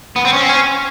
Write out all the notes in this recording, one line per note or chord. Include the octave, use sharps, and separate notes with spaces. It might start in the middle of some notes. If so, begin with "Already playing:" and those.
B3
C4
C#4
C4
C#4